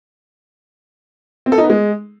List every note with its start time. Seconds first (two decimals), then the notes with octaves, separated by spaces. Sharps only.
1.46 C4
1.52 A4
1.58 D#4
1.64 B3
1.70 G#3